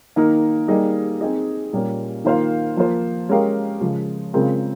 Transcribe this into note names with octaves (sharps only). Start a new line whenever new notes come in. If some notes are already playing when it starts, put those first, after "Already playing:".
D#3 A#3 D#4 A#4
G3 A#3 D#4 G#4 D#5
C4 D#4 G#4 D#5
A#2 G3 A#3 C#4
D#3 A#3 F4 C5 F5
F3 A#3 F4 C5
G#3 C#4 G4 A#4 F5
C#3 F3 G#3
C#3 G#3 C4 F4 A#4